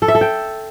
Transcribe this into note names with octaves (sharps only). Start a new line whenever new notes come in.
A4
E5
A4
G5